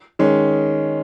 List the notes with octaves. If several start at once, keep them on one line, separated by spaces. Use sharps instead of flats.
D#3 G#3 C#4